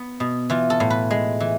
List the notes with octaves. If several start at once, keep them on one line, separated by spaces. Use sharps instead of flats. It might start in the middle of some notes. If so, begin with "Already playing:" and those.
Already playing: B3
B2
E3 F4
A4
A2
B4
G#3
E3